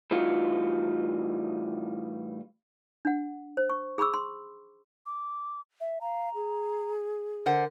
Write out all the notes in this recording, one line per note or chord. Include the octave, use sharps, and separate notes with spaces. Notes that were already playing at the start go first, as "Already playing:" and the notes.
A2 E3 G3 D#4 F4 F#4
D4 F#5
C5
C#6
G#4 B5 C#6 D6 E6
C6
D6
E5
F5 A#5
G#4
D3 A#4 C5 F#5